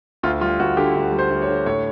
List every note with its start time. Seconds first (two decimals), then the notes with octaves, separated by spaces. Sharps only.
0.23 D2 F4
0.41 G3 F4
0.59 D2 F#4
0.77 D3 G4
0.95 D2
1.12 G3
1.19 C5
1.30 D2
1.42 C#5
1.48 D3
1.66 A2 C#5